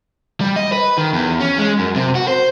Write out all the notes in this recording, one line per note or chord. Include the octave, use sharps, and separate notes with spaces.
G3
D#5
B4
D#3
E2
C#4
G#3
F#2
C3
F#4
C5